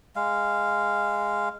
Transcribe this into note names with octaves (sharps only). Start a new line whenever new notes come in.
G#3 F5